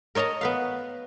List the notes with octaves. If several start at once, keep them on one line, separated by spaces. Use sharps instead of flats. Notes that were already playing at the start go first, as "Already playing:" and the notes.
A#4 C#5 D#5 A5 A#5
B3 B4 F5